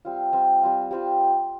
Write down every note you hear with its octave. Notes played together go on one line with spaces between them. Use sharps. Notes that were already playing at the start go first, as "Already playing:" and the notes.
G3 C4 F4
G3 C4 F4
G3 C4 F4
G3 C4 F4